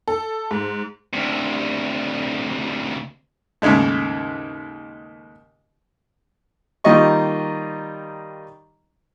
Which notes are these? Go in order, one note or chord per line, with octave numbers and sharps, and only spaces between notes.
A4
G#2
D2 C3
D#2 G#2 C#3 G#3 A3
D#3 G3 A#3 F4 D#5 C#6